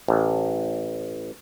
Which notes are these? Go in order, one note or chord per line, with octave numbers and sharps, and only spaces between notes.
A1